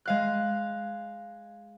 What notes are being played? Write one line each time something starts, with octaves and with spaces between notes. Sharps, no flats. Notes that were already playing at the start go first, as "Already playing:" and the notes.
G#3 F5 F#6